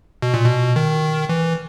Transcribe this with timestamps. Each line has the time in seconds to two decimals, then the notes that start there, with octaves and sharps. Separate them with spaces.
0.22 B2
0.34 A#2
0.44 B2
0.76 D#3
1.29 E3